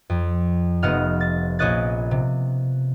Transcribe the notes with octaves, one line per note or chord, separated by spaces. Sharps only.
F2
F1 B3 D#5 F#5 F6
A6
A#1 C#4 C#5 D#5 F#6 A6
C3